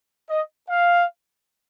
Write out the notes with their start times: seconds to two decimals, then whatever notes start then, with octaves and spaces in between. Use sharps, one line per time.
0.30 D#5
0.69 F5